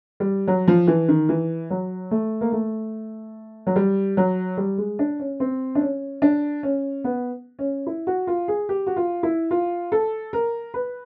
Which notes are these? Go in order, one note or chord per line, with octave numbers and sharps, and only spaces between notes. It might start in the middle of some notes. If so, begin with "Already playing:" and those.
G3
F#3
F3
E3
D#3
E3
F#3
A3
A#3
A3
F#3
G3
F#3
G3
G#3
D4
C#4
C4
D4
C#4
D4
C#4
B3
C#4
E4
F#4
F4
G#4
G4
F#4
F4
E4
F4
A4
A#4
B4